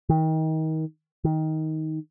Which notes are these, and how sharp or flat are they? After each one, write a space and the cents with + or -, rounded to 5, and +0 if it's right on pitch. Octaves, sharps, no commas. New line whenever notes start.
D#3 +30
D#3 +15